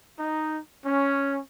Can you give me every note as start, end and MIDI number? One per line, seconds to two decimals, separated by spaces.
0.18 0.60 63
0.86 1.39 61